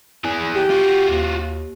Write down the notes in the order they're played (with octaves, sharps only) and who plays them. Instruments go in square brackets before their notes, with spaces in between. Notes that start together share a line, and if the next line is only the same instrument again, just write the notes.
[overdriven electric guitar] E3 G#4
[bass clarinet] G4
[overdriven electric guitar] F4 F#4
[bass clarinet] D#2